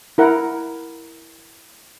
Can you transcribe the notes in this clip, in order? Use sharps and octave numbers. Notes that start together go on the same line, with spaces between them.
E4 A#4 F#5